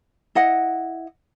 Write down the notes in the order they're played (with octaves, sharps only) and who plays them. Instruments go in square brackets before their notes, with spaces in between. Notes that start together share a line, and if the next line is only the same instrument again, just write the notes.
[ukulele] E4 D#5 F#5